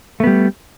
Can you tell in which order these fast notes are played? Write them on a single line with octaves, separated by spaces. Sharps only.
A3 B3 G3